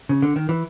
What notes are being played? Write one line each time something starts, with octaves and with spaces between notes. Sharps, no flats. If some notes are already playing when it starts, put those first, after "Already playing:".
C#3
D3
D#3
E3